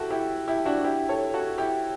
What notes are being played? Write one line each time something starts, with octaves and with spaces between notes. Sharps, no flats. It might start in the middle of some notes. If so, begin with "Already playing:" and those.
Already playing: E4 F#4 G4 A4
E4 G4
E4 G4
D4 F#4
E4 G4
A4 C#5
F#4 A4
E4 G4